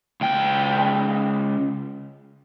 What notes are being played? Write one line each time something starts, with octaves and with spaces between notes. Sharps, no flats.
C#2 G5